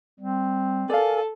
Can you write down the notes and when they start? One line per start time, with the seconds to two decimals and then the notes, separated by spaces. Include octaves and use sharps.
0.20 G3 C4
0.90 A4 A#4 D5 F5 G#5